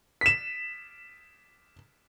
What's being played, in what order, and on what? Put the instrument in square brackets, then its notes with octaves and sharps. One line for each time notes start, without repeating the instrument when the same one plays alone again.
[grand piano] B6 E7